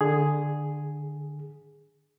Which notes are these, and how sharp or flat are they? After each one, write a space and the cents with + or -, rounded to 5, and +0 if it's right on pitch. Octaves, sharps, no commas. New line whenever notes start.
D3 +15 G#4 +0